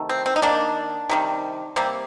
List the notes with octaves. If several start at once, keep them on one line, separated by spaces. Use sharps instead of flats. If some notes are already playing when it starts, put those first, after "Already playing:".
Already playing: C3 D#3 A3
C4
C4
D#4
D#3 A#3 D4
C3 D#3 G3
C3 G3 A#3 C4